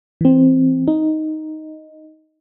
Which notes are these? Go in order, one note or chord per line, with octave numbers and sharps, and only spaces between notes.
E3 C4
D#4